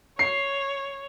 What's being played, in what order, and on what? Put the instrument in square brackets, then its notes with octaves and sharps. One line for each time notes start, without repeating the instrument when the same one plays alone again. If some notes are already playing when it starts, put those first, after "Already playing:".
[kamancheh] C#5 [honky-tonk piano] C7